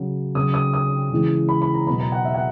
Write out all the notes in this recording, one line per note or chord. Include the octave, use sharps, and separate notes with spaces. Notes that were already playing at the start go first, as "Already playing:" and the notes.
Already playing: C#3 F#3
C#3 F#3 D#6
D#6
D#6
C#3 E3 G#3
B5
B5
A#5
B2 F#3 B5
A#5
F#5
E5
F#5